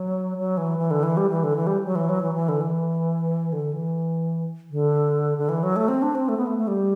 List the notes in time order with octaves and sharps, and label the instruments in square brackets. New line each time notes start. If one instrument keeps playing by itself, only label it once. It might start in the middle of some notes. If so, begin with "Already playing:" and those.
Already playing: [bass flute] F#3
F#3
E3
E3
D3
E3
G3
E3
D3
E3
G3
F#3
E3
F#3
E3
E3
D3
E3
D3
E3
D3
D3
E3
F#3
A3
C4
D4
C4
A3
B3
A3
A3
G3